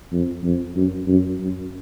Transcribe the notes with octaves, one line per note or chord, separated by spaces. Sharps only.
F2
F2
F#2
F#2
F#2